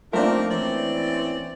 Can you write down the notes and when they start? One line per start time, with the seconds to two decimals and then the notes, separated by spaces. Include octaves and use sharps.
0.13 F3 A3 A#3 C4 D4 D#4 F4 A#4
0.50 E3 C4 C#4 D5